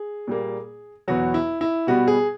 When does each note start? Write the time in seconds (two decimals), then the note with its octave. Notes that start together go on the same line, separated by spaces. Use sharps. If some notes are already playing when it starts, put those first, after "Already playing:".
Already playing: G#4
0.28 A#2 G3 A#3
1.08 E2 B2 F#3 B3 F#4
1.34 E4
1.61 E4
1.87 B2 G3 B3 F#4
2.08 G#4